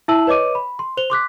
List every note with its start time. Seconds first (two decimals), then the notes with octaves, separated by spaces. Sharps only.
0.08 E4 E5 A5 E6 F#7
0.27 B4 C#5 D#5 D6 D#7
0.55 B5
0.79 C6
0.97 C5 F7 G7
1.10 C6 D6 F#6 B6